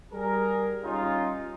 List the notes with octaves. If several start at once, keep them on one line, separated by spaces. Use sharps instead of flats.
G3 G#4 A#4
G3 C#4 D#4 F4